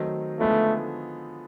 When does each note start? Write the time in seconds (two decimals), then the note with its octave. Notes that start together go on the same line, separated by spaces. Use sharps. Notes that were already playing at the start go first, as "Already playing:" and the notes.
Already playing: D#3 F#3 A3 C4 D#4
0.39 D3 F3 G#3 A3 B3 D#4